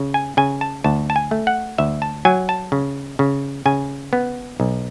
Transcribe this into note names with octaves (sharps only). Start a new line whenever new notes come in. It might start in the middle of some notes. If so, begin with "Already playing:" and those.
Already playing: C#3
G#5
C#3 G#5
A5
D2 A5
A5
G#5
A3
F#5
D2 E5
A5
F#3 G#5
A5
C#3
C#3
C#3 G#5
B3
B1